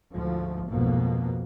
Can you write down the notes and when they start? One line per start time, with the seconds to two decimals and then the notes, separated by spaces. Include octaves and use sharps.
0.13 D2 G#2 F3 A3
0.67 B1 F2 G#2 B2 A#3